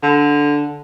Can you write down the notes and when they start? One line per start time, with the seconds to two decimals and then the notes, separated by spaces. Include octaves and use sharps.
0.03 D3